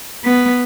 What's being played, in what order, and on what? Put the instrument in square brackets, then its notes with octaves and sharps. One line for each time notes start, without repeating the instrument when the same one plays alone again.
[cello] B3